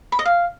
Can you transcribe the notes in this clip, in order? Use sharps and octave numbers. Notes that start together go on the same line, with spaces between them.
B5
D#5
F5